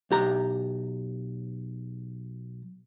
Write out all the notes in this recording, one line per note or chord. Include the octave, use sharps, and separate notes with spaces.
B1 G4 A#5